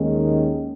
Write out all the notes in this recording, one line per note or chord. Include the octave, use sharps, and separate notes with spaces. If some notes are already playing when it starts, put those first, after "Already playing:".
Already playing: D#2 D#3 G#3 C#4